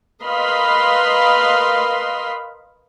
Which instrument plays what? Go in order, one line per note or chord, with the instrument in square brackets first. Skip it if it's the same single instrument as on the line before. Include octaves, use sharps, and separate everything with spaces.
[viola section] A#4 B4 D#5 F5 B5 C6